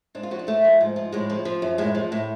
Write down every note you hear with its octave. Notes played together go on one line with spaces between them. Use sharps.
G#2 D4
F4
F3 F#4
D4
A2 A3
F3
G#2
F3
A2 G#3
F3
F3
F#2
A2 G#3
F3
A2